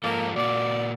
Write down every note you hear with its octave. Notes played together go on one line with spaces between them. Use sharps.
G#2 F3 A#3 A4
A#2 A#3 F#4 D5